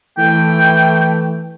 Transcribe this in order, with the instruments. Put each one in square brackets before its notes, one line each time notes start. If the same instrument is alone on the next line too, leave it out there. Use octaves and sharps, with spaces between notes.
[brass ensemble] E3 A3 [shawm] G5